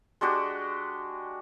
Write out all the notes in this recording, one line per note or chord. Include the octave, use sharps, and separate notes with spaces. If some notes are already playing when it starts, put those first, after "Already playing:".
G#3 D4 F#4 G4